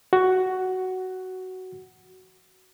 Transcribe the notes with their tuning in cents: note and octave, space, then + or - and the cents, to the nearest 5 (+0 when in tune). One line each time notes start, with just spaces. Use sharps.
F#4 +10